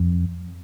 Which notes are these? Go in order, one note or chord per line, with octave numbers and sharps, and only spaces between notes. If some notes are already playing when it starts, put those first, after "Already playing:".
Already playing: F2